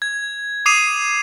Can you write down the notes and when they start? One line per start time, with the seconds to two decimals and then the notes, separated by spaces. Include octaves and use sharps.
0.02 G#6
0.66 D6 D#6 C7 D#7 F7